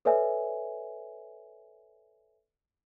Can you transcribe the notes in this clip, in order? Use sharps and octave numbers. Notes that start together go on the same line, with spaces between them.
A4 B4 C#5 D5 E5 G#5